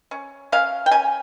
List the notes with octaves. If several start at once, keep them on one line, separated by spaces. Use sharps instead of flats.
C#4
C#4 F5
G5
C#4 G#5